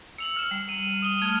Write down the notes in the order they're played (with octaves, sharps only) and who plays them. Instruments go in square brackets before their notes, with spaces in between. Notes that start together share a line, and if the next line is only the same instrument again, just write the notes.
[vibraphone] E6 [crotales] C#7 F7 F#7
[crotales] F6 E7
[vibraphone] G3
[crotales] D#7
D#6 D#7 G7
[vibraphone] A3 [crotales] F6 G#6